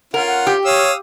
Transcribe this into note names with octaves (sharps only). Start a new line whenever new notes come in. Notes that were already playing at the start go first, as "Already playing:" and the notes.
C#4 F4 A#4 F#5
F#5
G4
C#5 F5 D#6 E6